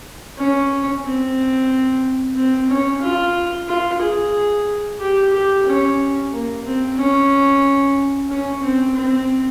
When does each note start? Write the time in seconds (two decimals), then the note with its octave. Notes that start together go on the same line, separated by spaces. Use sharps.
0.39 C#4
1.05 C4
2.36 C4
2.70 C#4
3.02 F4
3.69 F4
4.01 G#4
5.01 G4
5.34 G4
5.66 C#4
6.32 A#3
6.65 C4
6.98 C#4
8.30 C#4
8.62 C4
8.96 C4